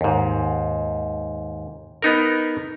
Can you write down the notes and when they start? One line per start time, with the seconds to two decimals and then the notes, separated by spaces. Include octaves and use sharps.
0.01 D#2 G#2
2.02 B3 D#4 A#4